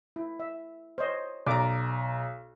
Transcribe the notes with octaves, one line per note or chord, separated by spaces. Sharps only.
E4
E5
C5 C#5 D#5
B1 D5 A#5 D6